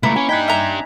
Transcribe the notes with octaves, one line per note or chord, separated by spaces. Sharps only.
C#2 A3 A#3 E4 B4 A#5
C#4 G#5
D4 D#4 G5 F#6 G#6 B6
E5 A#5